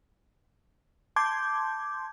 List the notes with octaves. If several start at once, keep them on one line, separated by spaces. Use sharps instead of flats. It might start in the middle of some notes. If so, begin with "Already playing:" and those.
A5 C6 D6 G6 G#6